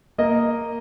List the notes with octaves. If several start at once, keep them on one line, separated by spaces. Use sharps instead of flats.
A#3 D#5